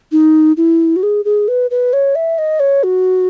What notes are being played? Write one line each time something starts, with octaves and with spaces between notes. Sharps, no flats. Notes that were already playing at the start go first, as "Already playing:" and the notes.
D#4
E4
F#4
G#4
G#4
B4
B4
C#5
E5
D#5
C#5
F#4